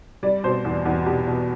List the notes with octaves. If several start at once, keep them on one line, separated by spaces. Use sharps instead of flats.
G3 D5
B2 C5
E2
E2
B2 G4
B2